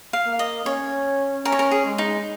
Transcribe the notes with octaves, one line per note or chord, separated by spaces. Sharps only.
F5
A#3
D#5
C#4 C#5
C#4 A#4
C#5
A#4
G#4
G#3
D#4